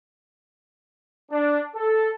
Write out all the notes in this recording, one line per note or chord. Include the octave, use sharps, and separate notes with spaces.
D4
A4